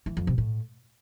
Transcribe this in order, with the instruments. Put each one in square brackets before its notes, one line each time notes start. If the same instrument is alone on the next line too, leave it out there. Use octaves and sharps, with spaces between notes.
[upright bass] E3
F2
C3
A2